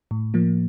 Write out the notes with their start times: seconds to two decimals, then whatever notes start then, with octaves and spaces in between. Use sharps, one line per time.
0.11 A2
0.34 F3 A#3